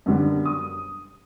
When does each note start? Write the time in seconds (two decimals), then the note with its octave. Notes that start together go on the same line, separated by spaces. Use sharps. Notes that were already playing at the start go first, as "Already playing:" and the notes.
0.06 F#2 B2 D3 G3
0.45 D#6